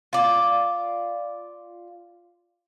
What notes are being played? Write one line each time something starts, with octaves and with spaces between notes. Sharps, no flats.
F4 D5